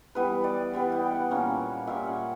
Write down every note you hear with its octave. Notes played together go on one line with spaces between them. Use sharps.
E3 G3 B3 B4
D5
E3 G3 B3
G5
F#5
A#2 G3 A#3 C#4
A#2 G3 A#3 C#4 E5
F#5